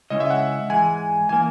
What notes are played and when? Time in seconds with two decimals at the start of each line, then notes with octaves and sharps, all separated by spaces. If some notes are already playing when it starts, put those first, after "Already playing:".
0.10 C#3 G#3 C#4 E4 D#5
0.20 E5
0.30 F#5
0.70 G#2 E3 G#3 G#5
1.29 E3 A#3 G#5